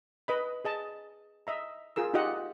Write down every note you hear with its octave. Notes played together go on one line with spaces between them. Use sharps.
B4 D#5 B5
G#4 D#5 A5
D#5 E5 A#5
F4 G#4 A#4 E6
D#4 F4 G4 D#5 F#5